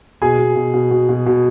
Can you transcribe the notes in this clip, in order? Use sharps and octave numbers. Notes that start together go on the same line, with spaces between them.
B2 G#4 G#5
B2
B2
B2
B2
B2
B2